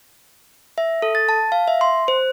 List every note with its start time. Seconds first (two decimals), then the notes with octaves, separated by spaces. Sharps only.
0.78 E5
1.02 A4
1.15 A6
1.29 A5
1.52 F5
1.68 E5
1.81 C6
2.08 C5